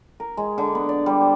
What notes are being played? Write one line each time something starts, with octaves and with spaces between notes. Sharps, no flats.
A#4
G#3
D3
B3
D5
G3
C5